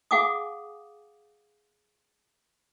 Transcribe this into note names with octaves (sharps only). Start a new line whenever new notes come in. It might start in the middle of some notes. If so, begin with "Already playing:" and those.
G#4 F5 F#5 G#5 D6 D#6